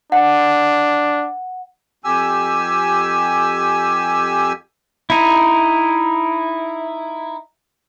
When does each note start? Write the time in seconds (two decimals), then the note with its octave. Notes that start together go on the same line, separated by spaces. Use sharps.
0.12 D4 F#5
2.04 F2 G4 G#5 E6
5.10 D#4 E4